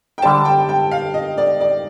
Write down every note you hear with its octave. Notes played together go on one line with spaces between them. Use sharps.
G5
D3 G3 D4 G4 C5 A5
G5
G5
F5
D#5
D5
D5